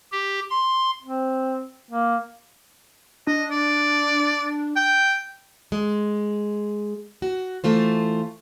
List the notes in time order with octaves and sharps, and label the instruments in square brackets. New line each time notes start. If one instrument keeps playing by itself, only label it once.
[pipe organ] G4
C6
[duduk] C4
A#3
[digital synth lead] D4 [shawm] D#5
[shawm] D5
G5
[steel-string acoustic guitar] G#3
F#4
E3 A3 F4 C5